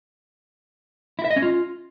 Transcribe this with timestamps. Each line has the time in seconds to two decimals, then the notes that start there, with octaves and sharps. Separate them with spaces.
1.19 E4
1.25 E5
1.30 D#5
1.36 C#4
1.42 F4